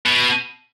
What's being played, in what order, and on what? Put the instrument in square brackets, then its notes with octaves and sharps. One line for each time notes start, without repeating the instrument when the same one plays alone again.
[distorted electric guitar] B2